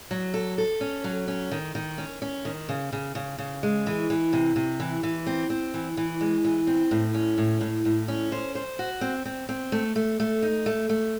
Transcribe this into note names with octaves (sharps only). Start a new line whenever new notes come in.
F#3
A4
A4
C#4
F#3
C#4
D#3
D#3
C#4
C#4
D#3
C#3
C#3
C#3
C#3
G#3
E3
E3
C3
C3
E3
E3
C4
C4
E3
E3
G#3
E3
C4
A2
C#4
A2
A2
A2
C#4
C5
C5
F#4
C4
C4
C4
A3
A3
A3
D#4
A3
A3